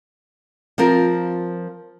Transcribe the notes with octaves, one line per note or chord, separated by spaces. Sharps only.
F3 C4 F4 A#4